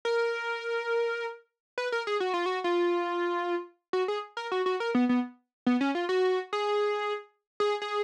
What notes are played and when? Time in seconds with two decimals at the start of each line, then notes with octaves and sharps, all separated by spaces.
0.05 A#4
1.78 B4
1.92 A#4
2.07 G#4
2.20 F#4
2.34 F4
2.46 F#4
2.64 F4
3.93 F#4
4.08 G#4
4.37 A#4
4.52 F#4
4.66 F#4
4.80 A#4
4.95 B3
5.09 B3
5.67 B3
5.81 C#4
5.95 F4
6.09 F#4
6.53 G#4
7.60 G#4
7.82 G#4